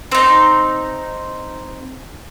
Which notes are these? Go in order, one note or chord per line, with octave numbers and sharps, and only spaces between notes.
C4 D#4